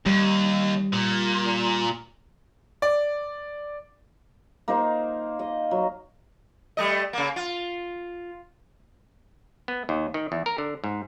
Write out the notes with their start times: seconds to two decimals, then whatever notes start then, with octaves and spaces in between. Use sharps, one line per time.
0.06 D#2 G3
0.94 A#2
2.82 D5
4.68 A#3 D#4 C5
5.39 D#5
5.71 F#3
6.77 G3 A3 D#5
7.13 C#3 A#3
7.36 F4
9.68 B3
9.89 D#2
10.14 D#3
10.32 E2
10.46 A#4
10.58 D3
10.84 G#2